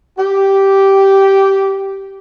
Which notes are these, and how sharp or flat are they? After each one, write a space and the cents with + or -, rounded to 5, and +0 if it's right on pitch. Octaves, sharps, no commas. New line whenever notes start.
G4 -10